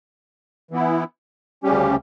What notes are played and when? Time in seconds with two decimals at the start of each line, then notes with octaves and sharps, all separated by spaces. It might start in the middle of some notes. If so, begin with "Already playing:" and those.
0.71 E3 B3 E4
1.63 D2 C#3 G3 C#4 G4